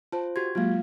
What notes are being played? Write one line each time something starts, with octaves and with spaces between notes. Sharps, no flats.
F4 C5 A5
F#4 G4 C6 G#6
F#3 G#3 A#3 F4 F5